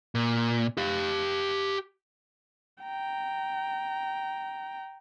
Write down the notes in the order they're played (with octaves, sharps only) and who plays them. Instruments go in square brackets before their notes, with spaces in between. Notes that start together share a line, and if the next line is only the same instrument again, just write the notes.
[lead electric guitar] A#2
G4 F5
[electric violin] G5 A#5